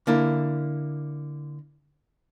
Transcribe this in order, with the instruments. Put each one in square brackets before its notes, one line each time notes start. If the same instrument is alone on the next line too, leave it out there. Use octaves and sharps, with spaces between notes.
[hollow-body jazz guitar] D3 A#3 E4